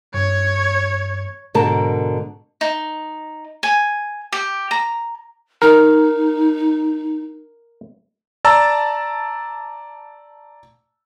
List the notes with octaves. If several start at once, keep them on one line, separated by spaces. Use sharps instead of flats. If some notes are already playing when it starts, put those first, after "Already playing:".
G2 C#5
G#2 B2 D3 A#4 A5
D#4
G#5
G4
A#5
D#4 A#4
D5 A5 A#5 E6